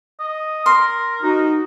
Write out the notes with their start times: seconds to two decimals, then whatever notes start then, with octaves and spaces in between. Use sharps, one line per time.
0.20 D#5
0.66 A#4 C6
1.23 D#4 F#4